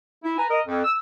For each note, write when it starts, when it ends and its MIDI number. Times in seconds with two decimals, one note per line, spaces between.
0.24 0.36 64
0.38 0.45 71
0.38 0.45 80
0.38 0.45 82
0.50 0.60 70
0.50 0.60 75
0.66 0.82 41
0.84 0.96 88